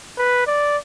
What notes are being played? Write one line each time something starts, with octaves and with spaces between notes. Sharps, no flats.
B4
D5